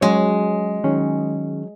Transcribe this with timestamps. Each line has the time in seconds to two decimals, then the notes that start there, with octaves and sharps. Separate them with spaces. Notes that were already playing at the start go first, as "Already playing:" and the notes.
0.01 F#3 G#3 C#4 F#4 C#5
0.84 D#3 F#3 C#4 G#4